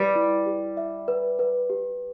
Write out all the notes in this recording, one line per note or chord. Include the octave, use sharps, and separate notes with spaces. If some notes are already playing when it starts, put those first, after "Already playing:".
Already playing: G3 B4
E4
G4
E5
B4
B4
G4